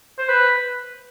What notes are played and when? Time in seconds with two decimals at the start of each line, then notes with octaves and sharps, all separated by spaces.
0.19 C5
0.29 B4